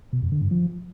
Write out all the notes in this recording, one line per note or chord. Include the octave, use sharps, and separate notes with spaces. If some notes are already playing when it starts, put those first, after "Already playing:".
B2
F2
D3
G2
F3